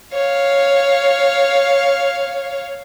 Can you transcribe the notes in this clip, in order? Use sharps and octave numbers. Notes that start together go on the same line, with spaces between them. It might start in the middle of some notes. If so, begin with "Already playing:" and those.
C#5 F5